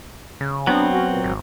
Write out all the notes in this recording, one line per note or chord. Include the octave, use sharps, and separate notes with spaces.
C#3
F#3 B3 C4 D4
C#4 F#4
A#2
G#1